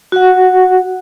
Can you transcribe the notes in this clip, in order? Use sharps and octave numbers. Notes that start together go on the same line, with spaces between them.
F#4 F#5